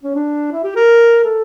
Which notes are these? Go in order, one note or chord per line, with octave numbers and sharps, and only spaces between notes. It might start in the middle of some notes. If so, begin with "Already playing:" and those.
C#4
D4
E4
G4
A#4
A4